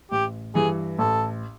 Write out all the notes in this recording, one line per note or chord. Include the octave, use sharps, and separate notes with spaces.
A1 G4
G2 E3 G#4
A1 A4